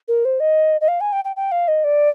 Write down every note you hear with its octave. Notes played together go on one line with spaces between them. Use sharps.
A#4
C5
D#5
D#5
F5
G#5
G5
G5
G5
F5
D#5
D5